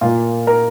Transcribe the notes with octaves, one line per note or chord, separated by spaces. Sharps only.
A#2 A#3 F4
A#4